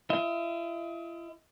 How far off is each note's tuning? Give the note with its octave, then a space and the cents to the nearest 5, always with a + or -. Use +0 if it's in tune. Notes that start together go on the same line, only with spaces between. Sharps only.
E4 +45 D#5 +35